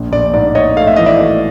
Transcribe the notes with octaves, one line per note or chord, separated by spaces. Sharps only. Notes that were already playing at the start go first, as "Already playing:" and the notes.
Already playing: A#1
A#1 D5
G#2 D5
G#2 C#5 D#5
A3 F5
E5
E3 D#5
D5 E5
A3